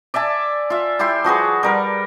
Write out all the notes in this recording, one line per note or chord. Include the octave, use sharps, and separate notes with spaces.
D5 E5 G#5 A5
F4 E5
E4 G4 G5 C6
F3 F#4 G#4 B4
G3 A#4 B4